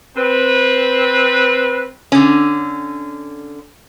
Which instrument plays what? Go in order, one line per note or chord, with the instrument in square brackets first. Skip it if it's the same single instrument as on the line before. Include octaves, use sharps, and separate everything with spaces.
[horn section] C4 B4
[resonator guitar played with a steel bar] D3 C#4